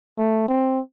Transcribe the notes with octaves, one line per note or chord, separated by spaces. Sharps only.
A3
C4